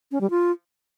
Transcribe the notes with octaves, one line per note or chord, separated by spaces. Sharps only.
C#4
G3
F4